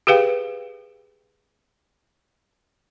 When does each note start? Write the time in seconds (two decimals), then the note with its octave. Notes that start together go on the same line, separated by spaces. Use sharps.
0.07 G4 G#4 B4 F5 G5